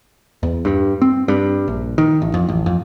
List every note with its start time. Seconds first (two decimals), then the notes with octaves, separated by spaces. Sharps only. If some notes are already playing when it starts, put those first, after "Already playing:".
0.43 E2
0.65 G2
1.02 C4
1.28 G2
1.68 A#1
1.98 D#3
2.22 A1
2.34 F2
2.49 A1
2.66 F2